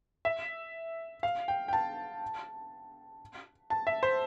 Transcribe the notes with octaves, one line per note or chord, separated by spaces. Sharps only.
E5
F5
G5
G5
A5
A5
E5
C5